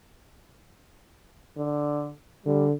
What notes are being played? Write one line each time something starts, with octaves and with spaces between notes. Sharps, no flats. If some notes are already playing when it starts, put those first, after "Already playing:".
D3
D3 G3